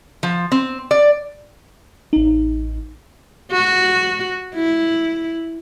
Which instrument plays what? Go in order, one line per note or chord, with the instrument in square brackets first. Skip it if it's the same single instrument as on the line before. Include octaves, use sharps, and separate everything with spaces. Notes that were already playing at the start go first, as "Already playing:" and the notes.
[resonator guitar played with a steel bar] F3
C4
D5
[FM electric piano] A1 D#4
[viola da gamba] F#4
E4